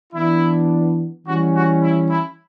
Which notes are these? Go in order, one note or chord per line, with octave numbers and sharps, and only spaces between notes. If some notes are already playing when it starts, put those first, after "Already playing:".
E3 B3 D4 E4
E3 G3 C#4 F#4
F#4
E4
E4